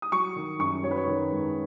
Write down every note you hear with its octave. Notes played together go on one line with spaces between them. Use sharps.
D#6
F#3 C#6
D#3
F#2 C#6
F#3 C#5
B4
C#5
D#3
G#2